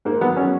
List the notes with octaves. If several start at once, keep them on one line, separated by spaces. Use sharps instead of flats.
G#2 A#3
F#3 B3
F#3 C#4